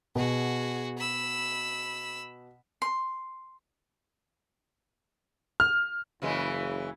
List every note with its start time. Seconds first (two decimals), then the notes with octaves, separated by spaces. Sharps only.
0.16 B2 F#4 G#4
0.98 B5 E6
2.82 C6
5.60 F6
6.22 F#1 C#3 E3 G#3